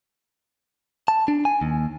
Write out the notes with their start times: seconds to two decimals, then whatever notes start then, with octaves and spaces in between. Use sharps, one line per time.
1.08 A5
1.28 D4
1.45 G#5
1.61 D#2